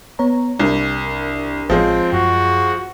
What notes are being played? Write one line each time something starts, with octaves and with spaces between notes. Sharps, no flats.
B3 C#5 A#5
C2 D4 A#4
A1 F3 G#3 C4 C#5
F#2 F#4